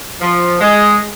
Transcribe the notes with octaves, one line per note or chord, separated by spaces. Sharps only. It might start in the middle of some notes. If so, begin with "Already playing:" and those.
F3
G#3